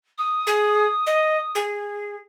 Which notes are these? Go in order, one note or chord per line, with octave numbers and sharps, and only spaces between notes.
D#6
G#4
D#5
G#4